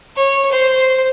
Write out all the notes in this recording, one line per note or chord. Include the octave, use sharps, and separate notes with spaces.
C#5
C5